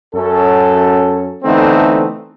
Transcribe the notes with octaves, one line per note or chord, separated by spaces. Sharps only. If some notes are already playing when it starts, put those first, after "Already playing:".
F#2 C#4 A4
D3 E3 A3 B3 C4 D#4